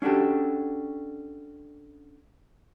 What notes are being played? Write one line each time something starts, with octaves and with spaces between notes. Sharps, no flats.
C#4 D4 F#4 G4 A4